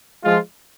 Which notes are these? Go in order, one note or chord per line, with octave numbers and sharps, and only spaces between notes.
F3 G#3 F4